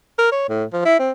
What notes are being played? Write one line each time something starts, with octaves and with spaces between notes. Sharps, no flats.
A#4
C#5
A2
F3
E4
C4